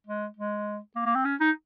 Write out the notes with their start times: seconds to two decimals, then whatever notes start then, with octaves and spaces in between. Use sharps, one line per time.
0.07 G#3
0.36 G#3
0.95 A#3
1.06 A#3
1.15 C4
1.25 C#4
1.40 D#4